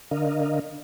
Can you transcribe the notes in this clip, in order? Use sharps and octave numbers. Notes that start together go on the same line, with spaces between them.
D3 D4 A#4 D#5 F5